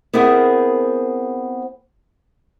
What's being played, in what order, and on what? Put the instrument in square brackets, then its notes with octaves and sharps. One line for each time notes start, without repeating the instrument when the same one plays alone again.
[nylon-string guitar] B3 C4 E4 G#4 A#4 C5